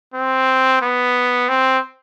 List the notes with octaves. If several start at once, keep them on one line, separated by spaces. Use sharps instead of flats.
C4
B3
C4